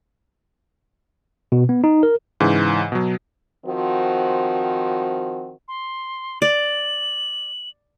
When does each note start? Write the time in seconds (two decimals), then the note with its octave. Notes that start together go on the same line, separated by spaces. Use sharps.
1.52 B2
1.69 B3
1.84 D#4
2.03 A#4
2.40 G#2 C#3 E3
2.92 B2 F#3
3.66 D#3 F3 C4 F#4
5.68 C6
6.42 D5 F#7